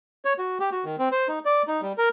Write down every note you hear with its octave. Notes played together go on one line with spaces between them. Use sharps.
C#5
F#4
G4
F#4
D#3
C4
C5
D#4
D5
D#4
G3
A#4